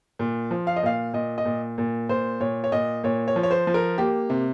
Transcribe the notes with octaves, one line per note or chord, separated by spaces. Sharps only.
A#2
F3
F5
D#5
A#2 F5
A#2 D#5
D#5
A#2
A#2
A#2 C5
A#2 C#5
C#5
A#2 D#5
A#2 C#5
C#5
F3
C#5
C5
F3
A#4
A#3 G4
C3